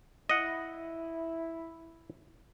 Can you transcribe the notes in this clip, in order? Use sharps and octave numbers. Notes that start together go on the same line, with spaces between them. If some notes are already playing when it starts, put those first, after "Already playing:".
E4 D#5 F#5